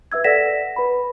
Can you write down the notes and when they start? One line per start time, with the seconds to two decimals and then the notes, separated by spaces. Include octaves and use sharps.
0.12 B4 E5 E6 G#6
0.24 A4 D5 F#5 A#6 B6 E7
0.76 B4 B5